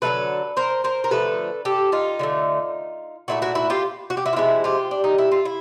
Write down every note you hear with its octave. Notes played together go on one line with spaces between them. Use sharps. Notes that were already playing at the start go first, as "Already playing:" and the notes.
D3 F#3 A3 A4 B4
A#4 C5
A#4 C5
A#4
D3 F3 A3 A4 B4
G4 A4
D#4 F4
D3 F#3 A3
A#2 F#3 A3 E4 F#4
E4 F#4
E4 F#4
F4 G4
F#4
G4
E4 F#4
F4
C3 F3 G#3 E4 F#4
F4 G4
D4
D#4
E4
F4
E4